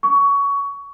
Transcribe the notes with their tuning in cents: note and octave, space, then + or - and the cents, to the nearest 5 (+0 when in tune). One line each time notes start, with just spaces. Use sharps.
C#6 +20